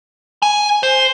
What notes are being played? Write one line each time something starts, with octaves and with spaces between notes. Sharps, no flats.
G#5
C5